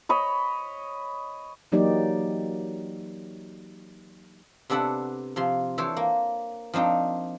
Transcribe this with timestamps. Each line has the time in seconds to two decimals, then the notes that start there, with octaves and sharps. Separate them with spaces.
0.09 C#5 D#5 B5
1.72 E3 F#3 A#3 D#4 G4 D5
4.70 C3 B3 D4 A4 F#5
5.36 C3 F3 C6
5.78 E3 D4 A4 C5 C#5
5.97 A#3
6.74 F3 C4 D4 D#4